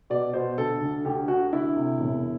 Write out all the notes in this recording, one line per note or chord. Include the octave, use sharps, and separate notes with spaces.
B2 D5
B2 C5
D2 A4
D2
D2 G4
D3 F#4
D2 E4
C3
E1